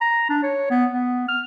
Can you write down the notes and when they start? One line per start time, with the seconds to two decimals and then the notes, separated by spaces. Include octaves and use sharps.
0.01 A#5
0.30 D4
0.43 C#5
0.71 B3
0.91 B3
1.29 F6